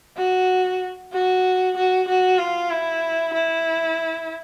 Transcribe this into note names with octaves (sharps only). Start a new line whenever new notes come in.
F#4
F#4
F#4
F#4
F4
E4
E4